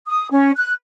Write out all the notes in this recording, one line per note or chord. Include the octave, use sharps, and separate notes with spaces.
D#6
C#4
F#6